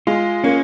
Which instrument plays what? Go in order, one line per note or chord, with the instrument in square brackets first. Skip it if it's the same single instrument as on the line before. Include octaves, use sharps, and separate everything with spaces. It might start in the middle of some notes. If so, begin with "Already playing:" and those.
[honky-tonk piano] G#3 [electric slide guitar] F4
[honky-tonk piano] A#3 [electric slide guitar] C#4